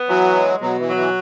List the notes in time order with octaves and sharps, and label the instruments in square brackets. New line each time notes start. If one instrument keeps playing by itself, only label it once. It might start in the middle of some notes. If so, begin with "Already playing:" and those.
Already playing: [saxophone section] B3
[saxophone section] E3 [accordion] F#3
[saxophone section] G#3
[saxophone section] B2 [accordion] F#3
[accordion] E3
[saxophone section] F#3
[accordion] E3